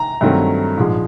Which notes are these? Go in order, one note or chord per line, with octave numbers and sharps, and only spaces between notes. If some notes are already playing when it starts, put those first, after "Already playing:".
Already playing: A#5
G2 D#3 F#3 A3 C4
A#1 G#2 F3 G#3